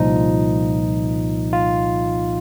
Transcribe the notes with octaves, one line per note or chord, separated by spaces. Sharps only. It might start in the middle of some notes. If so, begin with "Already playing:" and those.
Already playing: C2 A#2 F3 D#4
F4